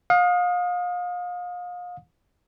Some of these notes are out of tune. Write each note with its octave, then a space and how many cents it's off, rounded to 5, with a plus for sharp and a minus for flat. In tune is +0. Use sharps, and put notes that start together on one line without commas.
F5 +35 D#6 +0